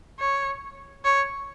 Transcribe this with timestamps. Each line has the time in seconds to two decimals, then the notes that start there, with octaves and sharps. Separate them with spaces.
0.19 C#5
1.04 C#5